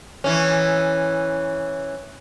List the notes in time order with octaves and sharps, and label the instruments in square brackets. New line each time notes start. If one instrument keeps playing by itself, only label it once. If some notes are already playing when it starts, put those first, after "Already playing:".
[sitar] E3 C#4